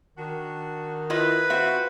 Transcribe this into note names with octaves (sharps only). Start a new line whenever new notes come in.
D#3 D4 F#4
E4 F4 B4 D#5
C4 F4 F#4 E5